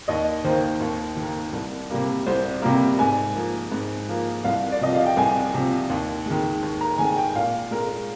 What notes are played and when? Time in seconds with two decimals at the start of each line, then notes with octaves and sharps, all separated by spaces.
0.08 D#2 D#5
0.44 D#3 A#3 C5
0.81 D#2
1.17 D#3 A#3
1.53 C2
1.90 C3 G3 A#3
2.27 C2 C5
2.62 C3 G3 A#3 A#4
2.99 G#2 G#5
3.35 F3 A#3
3.72 G#2
4.09 F3 A#3
4.44 C2 F5
4.72 D5
4.81 C3 F3 D#5
4.94 F5
5.06 G5
5.17 C2 G#5
5.54 C3 F3
5.90 D#2
6.26 D#3 G#3
6.63 D#2
6.81 A#5
6.98 D#3 G#3 G#5
7.17 G5
7.35 A#2 F5
7.71 G#3 A#4